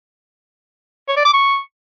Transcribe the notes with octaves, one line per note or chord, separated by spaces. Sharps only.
C#5
D5
D6
C#6